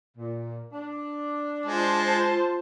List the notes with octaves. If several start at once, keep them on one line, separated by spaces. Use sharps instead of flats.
A#2
D4
G#3 F4 C5 A5